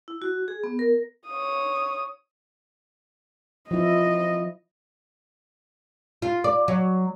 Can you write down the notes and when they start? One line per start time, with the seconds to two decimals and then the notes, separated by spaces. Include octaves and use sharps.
0.08 E4
0.22 F#4
0.48 G#4
0.64 B3
0.79 A#4
1.29 C#5 D#6
3.71 F3 E4 D#5
6.22 F4
6.44 D5
6.68 F#3